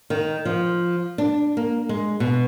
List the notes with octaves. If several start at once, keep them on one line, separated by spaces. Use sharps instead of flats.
D#3
F3
D4
A#3
G#3
B2